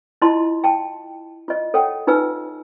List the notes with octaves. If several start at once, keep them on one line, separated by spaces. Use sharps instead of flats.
E4 F4 D#5 A5 C6
G5 A5
F4 D#5
A4 C#5 F#5 G5
D#4 F4 B4 G#5 E6